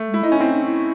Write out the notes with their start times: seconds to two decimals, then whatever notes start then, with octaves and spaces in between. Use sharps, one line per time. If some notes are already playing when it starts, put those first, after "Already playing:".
Already playing: A3
0.09 G#3 E4
0.23 D#4 E4
0.32 C#4
0.40 C4 E4
0.53 D#4
0.66 E4